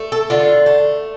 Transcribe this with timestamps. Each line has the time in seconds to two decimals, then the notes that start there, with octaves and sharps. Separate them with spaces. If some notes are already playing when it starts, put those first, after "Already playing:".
Already playing: A3
0.12 A4
0.30 D3 F4
0.66 A3